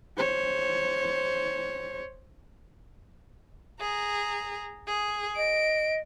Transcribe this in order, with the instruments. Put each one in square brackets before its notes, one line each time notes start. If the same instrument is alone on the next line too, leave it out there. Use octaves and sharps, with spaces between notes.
[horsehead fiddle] C5 C#5
[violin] G#4 A#5
G#4
[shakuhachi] D#5 [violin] D7